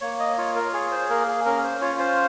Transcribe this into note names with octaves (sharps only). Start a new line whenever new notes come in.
A#3 C#5
D#5
F4 C#5
A#4
G#4 C#5
C5
A#3 A#4
G#4
C#4 A#4
C5
F4 C#5
C5